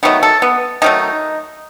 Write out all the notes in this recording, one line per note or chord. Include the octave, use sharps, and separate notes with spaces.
D#3 F#3 A3 B3
A4
B3
D#3 F#3 A3 D#4